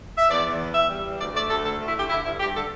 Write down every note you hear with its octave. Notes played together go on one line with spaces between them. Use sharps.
E5
E2 D5
E2
E3
E2 E5
G3
E2
D2 D5
A3 D5
D2 A4
D3 A4
A3
E4
D3 G4
D3 E4
G2 E4
G2 G4
D3 A4